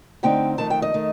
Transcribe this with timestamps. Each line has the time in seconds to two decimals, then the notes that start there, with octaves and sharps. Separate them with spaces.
0.23 D3 A3 C4 D#4 G5
0.58 F2 D#3 A3 A5
0.70 G5
0.82 D#5
0.94 D#3 A3